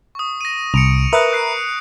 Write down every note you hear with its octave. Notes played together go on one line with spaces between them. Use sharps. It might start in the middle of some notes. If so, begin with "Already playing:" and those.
C#6 D#6
A#6 D#7
C2 C#7 D7 F7
A#4 B4 E5 D#6 F#6 A#6
F#6 C7 D7